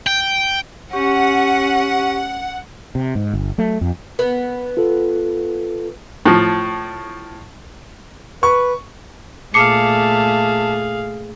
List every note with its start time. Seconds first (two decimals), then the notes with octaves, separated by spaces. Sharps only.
0.07 G5
0.93 C#4 G4 F#5 C#6
2.95 C3
3.15 G#2
3.33 G1
3.58 F#3 A3
3.81 F2
4.19 B3
4.77 F4 A4
6.26 A2 F3
8.43 B4 C#6
9.54 A#2 A3 G#4 F5 A5 D6 C7 C#7